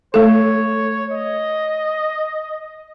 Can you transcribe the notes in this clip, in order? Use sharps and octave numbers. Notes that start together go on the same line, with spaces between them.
A3 A4 C#5
D#5